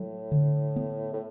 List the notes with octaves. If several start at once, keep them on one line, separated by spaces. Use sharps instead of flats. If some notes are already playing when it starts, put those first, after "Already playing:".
Already playing: A2 F#3
D3
B3
A2